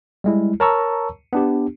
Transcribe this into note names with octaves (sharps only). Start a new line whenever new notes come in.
G3 G#3 E4
A#4 C#5 A5 A#5 C#6 E6
B3 D4 G4